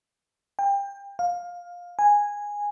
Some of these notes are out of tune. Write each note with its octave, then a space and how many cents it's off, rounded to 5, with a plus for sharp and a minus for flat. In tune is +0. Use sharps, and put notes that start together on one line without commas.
G5 +30
F5 +15
G#5 -10